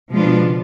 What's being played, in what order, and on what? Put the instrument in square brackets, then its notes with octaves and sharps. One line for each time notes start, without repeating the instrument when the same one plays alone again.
[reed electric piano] B2 [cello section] F3 G#3 B3 D4 F4
[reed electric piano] B2
C#3